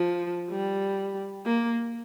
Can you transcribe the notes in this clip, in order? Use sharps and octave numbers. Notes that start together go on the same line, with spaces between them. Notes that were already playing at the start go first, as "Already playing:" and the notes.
Already playing: F3
G3
A#3